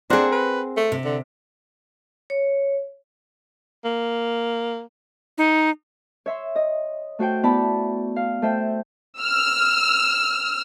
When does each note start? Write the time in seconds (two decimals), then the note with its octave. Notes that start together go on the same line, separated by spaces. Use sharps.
0.10 C4 D4 G#4 A#4 C5 F#5
0.32 B4
0.77 A3
0.92 C3
1.05 D3
2.30 C#5
3.84 A#3
5.38 D#4
6.26 C#5 E5 C6
6.56 D#5
7.19 A3 F#4 C5 G5
7.43 B3 E4 D5 A5 B5
8.16 F5
8.42 A3 C5 E5 G5
9.21 E6 F6